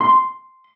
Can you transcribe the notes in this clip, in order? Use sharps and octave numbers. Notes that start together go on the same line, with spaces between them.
C6